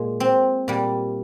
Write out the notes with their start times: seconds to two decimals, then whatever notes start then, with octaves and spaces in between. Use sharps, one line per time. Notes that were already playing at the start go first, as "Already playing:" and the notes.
Already playing: A#2 G#3
0.20 C4
0.68 A#2 G3